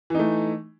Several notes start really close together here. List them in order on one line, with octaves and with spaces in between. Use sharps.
E3 D#4 A3